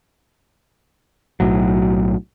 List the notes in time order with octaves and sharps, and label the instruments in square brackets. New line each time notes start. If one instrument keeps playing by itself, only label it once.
[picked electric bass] B1 A2 F#3